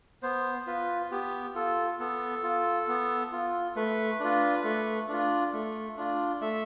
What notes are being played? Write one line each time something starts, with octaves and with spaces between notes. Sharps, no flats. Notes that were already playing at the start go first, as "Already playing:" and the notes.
B3 C5
F4 B4
B3 G4
F4 A4
B3 A4
F4
B3
F4
A3 B4
D4 F4
A3
D4 F4
A3
D4 F4
A3 E5